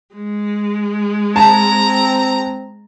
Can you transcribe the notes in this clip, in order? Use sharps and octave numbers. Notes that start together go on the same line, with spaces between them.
G#3
C4 A5 A#5